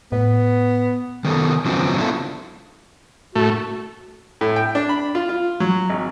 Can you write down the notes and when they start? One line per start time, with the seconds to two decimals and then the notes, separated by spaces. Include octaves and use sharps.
0.12 A2 B3
1.25 D#3 B3 A4
1.65 C#3 F3 F#3 B3 C4
1.98 B3 D4 E4 F4 A4
3.35 A2 A3 F#4
4.41 A2
4.56 G5
4.75 D4
4.89 B5
5.15 F4
5.29 F4
5.60 F#3
5.89 G#1